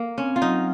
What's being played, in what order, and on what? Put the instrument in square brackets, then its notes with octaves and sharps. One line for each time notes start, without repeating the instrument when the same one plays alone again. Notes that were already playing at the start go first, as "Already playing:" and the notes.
Already playing: [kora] A#3
[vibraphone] C4 [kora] C#4
[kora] F4
[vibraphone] F#3 [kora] D#4